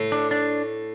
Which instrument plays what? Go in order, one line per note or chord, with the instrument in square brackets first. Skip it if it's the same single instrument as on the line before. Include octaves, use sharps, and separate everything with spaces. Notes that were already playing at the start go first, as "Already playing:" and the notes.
Already playing: [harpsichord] A2
[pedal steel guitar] D4
D4